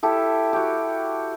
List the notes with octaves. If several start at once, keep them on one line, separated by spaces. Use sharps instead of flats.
E4 G4 A4
F#4 G4